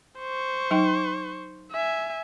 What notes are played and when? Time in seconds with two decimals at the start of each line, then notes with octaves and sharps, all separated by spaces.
0.19 C5 C#6
0.71 F#3 D#4 G5
1.72 E5 G#5